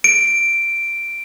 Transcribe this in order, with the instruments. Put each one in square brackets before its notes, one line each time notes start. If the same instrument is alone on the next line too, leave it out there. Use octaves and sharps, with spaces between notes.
[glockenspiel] D7